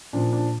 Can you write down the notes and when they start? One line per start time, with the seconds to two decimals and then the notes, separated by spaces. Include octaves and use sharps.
0.13 A#2 F3 D4
0.33 D4